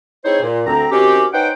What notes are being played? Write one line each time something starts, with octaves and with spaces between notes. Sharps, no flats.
C4 D#4 E4 G#4 C5 C#5
A#2
D2 C4 A#5
D#3 C4 C#4 F#4 G4
C#4 D#4 B4 C5 F#5 G5